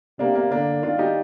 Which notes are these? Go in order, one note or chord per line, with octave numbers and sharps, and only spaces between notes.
C3 A#3 D4
A#3
D3 A#3 D4
D#3 D4 F4
D#4 G4